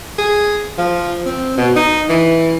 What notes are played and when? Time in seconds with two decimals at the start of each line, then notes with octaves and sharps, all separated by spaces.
0.18 G#4
0.78 F3
1.26 C4
1.57 B2
1.76 D#4
2.09 E3